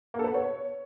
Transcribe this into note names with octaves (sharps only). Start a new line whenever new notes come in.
A#3
A4
B4
B3
C#5